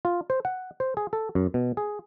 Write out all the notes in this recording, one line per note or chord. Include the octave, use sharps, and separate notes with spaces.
F4
C5
F#5
C5
G#4
A4
F#2
B2
G#4